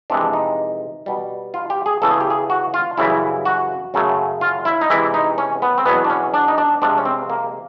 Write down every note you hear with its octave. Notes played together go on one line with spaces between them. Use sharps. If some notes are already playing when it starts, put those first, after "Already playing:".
F2 C3 E3 G#3 D4
D#4
B2 G3
F4
G4
G#4
E2 C#3 E3 A3 A4
G#4
G4
G#4
F#4
F4
F#2 C#3 E3 G3 E4
F#4
F#2 C#3 F#3 A3
F4
E4
D#4
C3 E3 G#3 E4
D#4
C#4
B3
C4
E2 B2 F#3 B3
D4
C#4
D4
D#4
D4
C3 F3 G#3 D4
C#4
C4
A#3